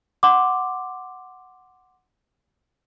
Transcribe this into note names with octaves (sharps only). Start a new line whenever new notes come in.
F#5 C6 D6